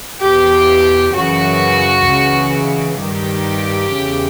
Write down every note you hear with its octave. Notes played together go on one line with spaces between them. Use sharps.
E2 B2 G4
F#2 C#3 E3 F#4
C#2 C#3 E3
G2 D#3 G4
E2 C#3 E3